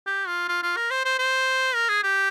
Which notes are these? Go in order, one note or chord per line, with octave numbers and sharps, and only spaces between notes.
G4
F4
F4
F4
A#4
C5
C5
C5
A#4
G#4
G4